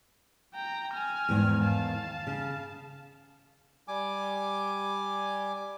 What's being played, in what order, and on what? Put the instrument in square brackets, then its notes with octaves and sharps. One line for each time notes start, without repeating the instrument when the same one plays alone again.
[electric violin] G5 A#5
G#5 F6
[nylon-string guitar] E2 G#2 D#3
[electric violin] F5 A5
[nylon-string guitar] C#3
[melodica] G3 G#5 D6